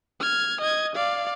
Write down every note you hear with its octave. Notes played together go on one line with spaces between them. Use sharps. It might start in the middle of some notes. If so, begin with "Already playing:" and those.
F6 G#6
D#5 G#6
D5 F5